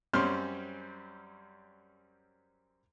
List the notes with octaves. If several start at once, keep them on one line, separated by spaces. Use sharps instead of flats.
F#2 G3 C4 C#4 C6 F6